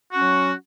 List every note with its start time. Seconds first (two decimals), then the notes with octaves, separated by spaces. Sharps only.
0.11 F#4
0.16 C#4
0.20 F#3